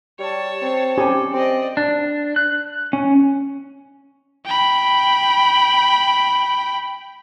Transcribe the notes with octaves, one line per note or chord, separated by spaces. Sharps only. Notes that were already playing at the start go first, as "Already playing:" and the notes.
G3 C#5 A5
C4
C#4 G4 A4 G#5
C4 D5 D#5
D4
F#6
C#4
G5 B5